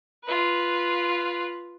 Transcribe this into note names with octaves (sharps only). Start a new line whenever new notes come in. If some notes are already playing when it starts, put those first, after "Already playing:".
F4 B4